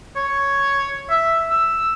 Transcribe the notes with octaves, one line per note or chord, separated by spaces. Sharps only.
C#5
E5
E6